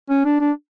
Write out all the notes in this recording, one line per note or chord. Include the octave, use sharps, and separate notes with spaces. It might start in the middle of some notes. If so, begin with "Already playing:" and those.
C#4
D4
D4